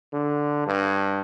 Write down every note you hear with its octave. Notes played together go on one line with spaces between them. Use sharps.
D3
G2